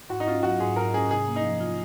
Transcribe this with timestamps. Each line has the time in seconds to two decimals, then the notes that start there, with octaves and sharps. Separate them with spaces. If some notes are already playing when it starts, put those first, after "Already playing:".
0.10 G#2 F#4
0.20 D#4
0.27 C#4 F4
0.43 F#3 F#4
0.60 G#2 G#4
0.76 G#2 A#4
0.94 C#4 G#4
1.10 C3 G#4
1.27 A#3
1.36 D#4
1.43 F3
1.60 F4